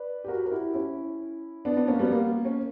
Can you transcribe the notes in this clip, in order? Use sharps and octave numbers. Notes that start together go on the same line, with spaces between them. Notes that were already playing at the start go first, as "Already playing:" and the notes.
Already playing: B4 D5
G4
F#4 A#4
A#4
E4 G4
C#4 E4
B3 D4
B3 D4
A#3 C#4
G3 B3
A#3
C#4